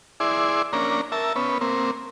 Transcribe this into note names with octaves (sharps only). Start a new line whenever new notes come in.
E4 G#4 D5 C6
A#3 C#4 D4 A#5
A#4 E5 A5
B3 C#4
A#3 C4